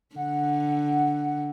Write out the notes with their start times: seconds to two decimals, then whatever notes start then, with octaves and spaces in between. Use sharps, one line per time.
0.16 D3 F#5